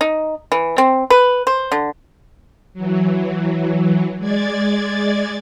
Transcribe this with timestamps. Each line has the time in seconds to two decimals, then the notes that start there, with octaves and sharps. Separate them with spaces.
0.01 D#4
0.52 E3
0.78 C4
1.10 B4
1.47 C5
1.72 D3
2.74 E3 F#3
4.18 G#3 D5 G#6 A6